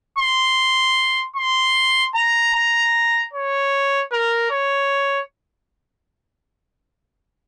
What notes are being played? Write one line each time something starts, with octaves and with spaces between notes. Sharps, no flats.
C6
C6
A#5
A#5
C#5
A#4
C#5